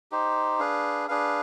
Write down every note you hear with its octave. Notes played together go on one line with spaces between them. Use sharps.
D#4 G4 C5
D4 G#4 B4 F5
D4 G#4 B4 F5